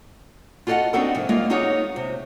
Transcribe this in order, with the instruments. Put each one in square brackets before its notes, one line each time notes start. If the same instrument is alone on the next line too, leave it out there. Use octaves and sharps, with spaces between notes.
[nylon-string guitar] F4 F#4 A4 C5 D#5 F#5
C4 D4 D#4 F#4 A4 A#4
F2 G#2 C3
G3 G#3 A#3 F4
B3 D#4 F4 F#4 G#4 C#5
C3